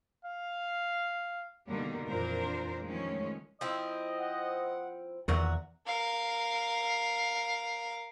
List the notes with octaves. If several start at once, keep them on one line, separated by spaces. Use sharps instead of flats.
F5
B2 D3 D#3 G3 A#3
F2 A#2 E3 D4 A#4 C5
D#3 F3 G#3 A3 C#4
F3 C4 E4 D#5
F#5
E2 A#2 D#3 F#4 E5 A#5
A#4 F5